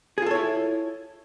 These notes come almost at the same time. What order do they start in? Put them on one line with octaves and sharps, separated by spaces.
G#4 F4 A4 C#5 E4